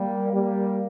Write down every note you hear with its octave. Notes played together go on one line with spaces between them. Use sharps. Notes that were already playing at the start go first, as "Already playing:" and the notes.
Already playing: G3 A#3
G3 A#3